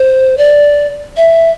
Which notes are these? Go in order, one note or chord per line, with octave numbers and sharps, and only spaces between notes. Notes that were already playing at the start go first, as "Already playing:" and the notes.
Already playing: C5
D5
E5